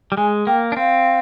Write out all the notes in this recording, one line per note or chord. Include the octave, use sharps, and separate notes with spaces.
G3
G#3 G#5
A#3 G5
D4
C4 F5